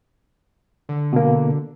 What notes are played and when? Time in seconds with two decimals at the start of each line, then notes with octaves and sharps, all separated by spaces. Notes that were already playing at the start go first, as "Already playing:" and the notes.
0.89 D3
1.13 B2 A#3